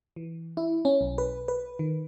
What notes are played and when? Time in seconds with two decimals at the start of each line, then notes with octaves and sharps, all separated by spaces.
0.16 E3
0.57 E4
0.85 C#4
1.01 B1
1.18 B4
1.48 B4
1.79 D#3